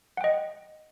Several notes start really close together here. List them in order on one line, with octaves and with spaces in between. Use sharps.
F#5 G5 D#5